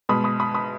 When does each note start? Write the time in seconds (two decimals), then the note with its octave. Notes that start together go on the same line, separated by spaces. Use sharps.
0.09 B2 G#3 B5 D#6
0.24 B5 D#6
0.40 B5 D#6
0.54 B5 D#6